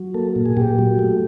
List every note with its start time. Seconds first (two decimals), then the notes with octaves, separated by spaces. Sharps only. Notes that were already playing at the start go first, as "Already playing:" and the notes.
Already playing: F#3
0.14 A#3 A4
0.36 A#2
0.46 G#4
0.57 A#2 G4
0.79 F#3
0.99 A3